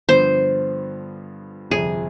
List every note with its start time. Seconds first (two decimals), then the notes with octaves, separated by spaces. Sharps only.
0.09 G2 D3 F3 B3 C5
1.71 G1 F2 C3 G#4